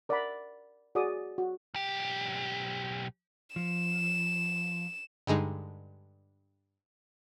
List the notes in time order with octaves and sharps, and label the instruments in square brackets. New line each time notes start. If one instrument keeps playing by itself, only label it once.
[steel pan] A#4 D5 E5 F#5 A#5 B5
F#4 G#4 D5 D6 D#6
F#4
[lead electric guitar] B1 G4
[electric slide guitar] F3 [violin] E7
[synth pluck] G2 D3 G#3 D#4